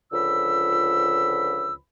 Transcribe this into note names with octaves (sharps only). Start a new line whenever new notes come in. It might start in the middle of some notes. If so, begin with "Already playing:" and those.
C#2 D3 F3 B5 E6